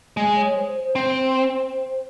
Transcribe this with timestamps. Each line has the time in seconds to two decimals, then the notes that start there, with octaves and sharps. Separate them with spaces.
0.16 G#3 D#5
0.36 C#5
0.56 C5
0.75 C5
0.95 C4